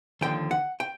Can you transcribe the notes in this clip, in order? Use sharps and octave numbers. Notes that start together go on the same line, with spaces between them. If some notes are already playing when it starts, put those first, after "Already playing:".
D#2 D3 F3 G5
F#5
G5